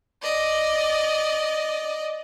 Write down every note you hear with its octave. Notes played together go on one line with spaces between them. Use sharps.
D5 D#5